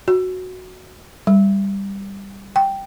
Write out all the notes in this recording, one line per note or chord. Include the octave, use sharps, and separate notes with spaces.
F#4
G3
G5